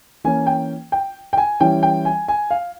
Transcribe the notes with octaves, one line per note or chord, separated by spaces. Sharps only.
E3 A#3 C#4 G#5
G5
G5
G5
G#5
E3 G3 C#4 E4 G5
G5
G#5
G#5
F5